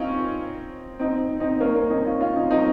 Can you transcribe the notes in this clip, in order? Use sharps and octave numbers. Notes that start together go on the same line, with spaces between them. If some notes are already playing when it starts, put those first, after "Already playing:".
Already playing: C4 C#4 D#4 F4
C4 D#4
C4 D#4
A#3 C#4
A#3 C#4
C4 D#4
C#4 F4
C#4 F4
C4 D#4
C4 D#4